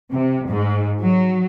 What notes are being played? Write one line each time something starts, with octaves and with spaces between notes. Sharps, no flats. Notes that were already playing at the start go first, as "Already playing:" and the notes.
C3
G#2
F#3